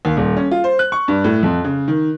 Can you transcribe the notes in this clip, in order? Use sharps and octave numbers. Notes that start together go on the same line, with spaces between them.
D#2
D#1
C#4
F4
C5
F#6
C#6
G2
A2
F2
C#3
D#3